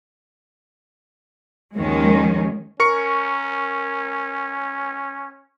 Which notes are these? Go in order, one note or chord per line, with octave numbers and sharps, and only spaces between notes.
D#2 D#3 F3 G#3 C#4
C#4 A#4 C#6 C#7